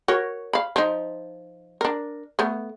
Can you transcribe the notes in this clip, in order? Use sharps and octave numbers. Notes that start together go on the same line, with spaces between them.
F#4 A#4 C#5
F5 B5
F3 D#4
D4 A#4
A3 B3